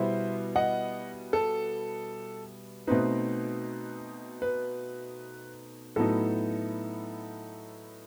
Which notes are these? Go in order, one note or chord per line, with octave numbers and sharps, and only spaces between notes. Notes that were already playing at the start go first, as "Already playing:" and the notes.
Already playing: B2 G3 B3 E4 C5 E5
D#5 F#5
A4
B2 A3 C4 D#4 B4
B4
A2 F#3 B3 D#4 A4